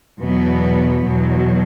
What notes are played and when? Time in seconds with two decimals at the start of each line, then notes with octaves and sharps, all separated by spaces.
0.23 E2 B2 F#3 B3
1.05 E2 B2 F#3